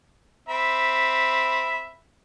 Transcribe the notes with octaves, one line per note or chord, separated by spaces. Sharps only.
C4 E5 B5